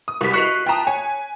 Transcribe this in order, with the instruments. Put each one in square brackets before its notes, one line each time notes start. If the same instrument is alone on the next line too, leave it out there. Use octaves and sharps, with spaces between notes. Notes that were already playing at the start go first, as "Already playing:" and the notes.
[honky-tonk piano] D#6
[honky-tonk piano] C2 B6 [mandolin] G4 B4
[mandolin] F#4 B4 D#5 [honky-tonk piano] F#6 C7 F7
[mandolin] F4 A5 D#6 [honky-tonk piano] G5 A#5
[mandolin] C#5 [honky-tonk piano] G#5